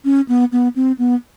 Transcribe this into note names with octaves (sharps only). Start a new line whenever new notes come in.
C#4
B3
B3
C4
B3